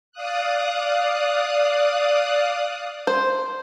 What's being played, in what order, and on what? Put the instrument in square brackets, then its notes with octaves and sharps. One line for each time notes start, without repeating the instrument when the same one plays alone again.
[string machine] D5 F5 D#6 F#6
[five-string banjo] C5